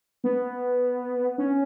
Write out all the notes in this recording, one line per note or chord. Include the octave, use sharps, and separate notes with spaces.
B3
C#4